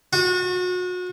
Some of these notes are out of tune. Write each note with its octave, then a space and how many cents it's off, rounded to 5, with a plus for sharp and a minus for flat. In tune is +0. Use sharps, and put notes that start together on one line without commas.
F#4 -35